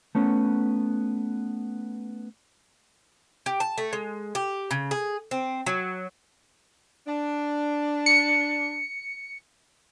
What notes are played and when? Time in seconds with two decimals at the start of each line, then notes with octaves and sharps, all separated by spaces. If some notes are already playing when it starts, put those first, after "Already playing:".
0.15 A3 B3 C#4
3.46 G4
3.60 A5
3.78 A3
3.93 G#3
4.35 G4
4.71 C#3
4.91 G#4
5.31 C4
5.66 F#3
7.07 D4
8.06 C#7